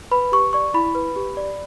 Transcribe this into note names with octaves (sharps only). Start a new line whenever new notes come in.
B4 B5
G4 C#6
D5 C#6
E4 B5
B4
G4
D5